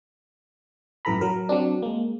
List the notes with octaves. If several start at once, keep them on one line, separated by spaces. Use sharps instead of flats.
A1 F#2 E3 A4 A#5 B5
F#3 A#4
F#3 C4 D4
G#3 A#3